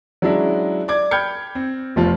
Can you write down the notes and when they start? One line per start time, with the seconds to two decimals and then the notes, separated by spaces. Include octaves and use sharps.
0.22 F#3 G#3 C#4 D4 E4
0.88 D5 D6 G#6
1.11 G5 B5 F6 G6 G#6 C#7
1.55 C4
1.96 F1 F3 F4